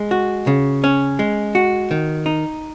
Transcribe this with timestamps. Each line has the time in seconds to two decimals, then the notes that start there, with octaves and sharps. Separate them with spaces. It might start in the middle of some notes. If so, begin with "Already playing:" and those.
Already playing: G#3
0.11 F#4
0.47 C#3
0.84 C#4
1.19 G#3
1.55 F#4
1.91 D#3
2.26 D#4